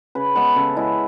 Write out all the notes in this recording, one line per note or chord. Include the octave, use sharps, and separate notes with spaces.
C#3 B4
G#3 B3 B4
C#3 A4
G#3 B3 E4